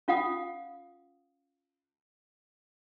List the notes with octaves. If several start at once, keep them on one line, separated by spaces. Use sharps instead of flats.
C#4 F4 F5 F#5 D#6